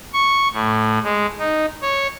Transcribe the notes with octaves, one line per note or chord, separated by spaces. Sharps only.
C#6
A2
G#3
D#4
C#5